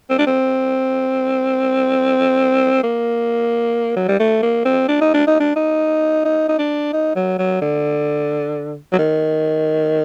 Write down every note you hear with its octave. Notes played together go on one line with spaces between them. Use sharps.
C4
D4
C4
A#3
F#3
G3
A3
A#3
C4
D4
D#4
D4
D#4
D4
D#4
D#4
D#4
D4
D#4
F#3
F#3
D3
F#3
D#3